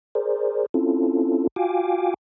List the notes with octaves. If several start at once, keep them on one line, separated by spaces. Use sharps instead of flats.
G#4 A#4 C5 D5
C4 C#4 E4 F4 A4
F4 F#4 F5 G5 G#5 D6